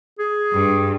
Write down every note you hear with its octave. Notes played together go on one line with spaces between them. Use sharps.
G#4
G2